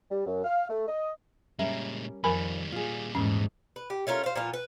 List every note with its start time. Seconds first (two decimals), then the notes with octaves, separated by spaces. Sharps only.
0.11 G3
0.26 F#2
0.44 F5
0.69 A3
0.87 D#5
1.59 A#2 G3 G#3 C#4 A#4 E5
2.24 F2 D#3 G3 A#4 G#5 B5
2.72 A#2 G3 F4 G#4
3.15 E2 G#2 C#4
3.76 B4
3.90 G4
4.07 A3 C#4 F4 A#4
4.24 C5 F5
4.36 A#2 F3 B3 F4
4.54 B4